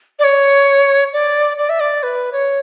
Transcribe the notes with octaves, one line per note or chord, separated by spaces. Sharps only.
D5
C#5
D5
D5
E5
D5
B4
C#5